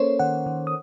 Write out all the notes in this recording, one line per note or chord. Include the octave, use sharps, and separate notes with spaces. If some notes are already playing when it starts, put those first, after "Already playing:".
Already playing: A#3 C#4 A4 A#4 C5 C#5
D#3 F#5
D#3
D#6